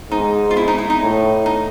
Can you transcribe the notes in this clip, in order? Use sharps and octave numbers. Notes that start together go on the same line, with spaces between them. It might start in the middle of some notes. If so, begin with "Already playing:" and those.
G#2 D#4
F4
E4
D#4
E4
D#4
A2
D#4